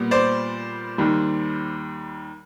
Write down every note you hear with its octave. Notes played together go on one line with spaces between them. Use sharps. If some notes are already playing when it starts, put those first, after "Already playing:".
Already playing: A#2 G3 B3
C5 D5
D#2 D#3 G3